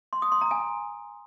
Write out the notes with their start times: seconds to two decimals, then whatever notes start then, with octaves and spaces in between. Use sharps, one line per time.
0.13 C6
0.22 D#6
0.32 C6
0.41 A#5
0.51 G#5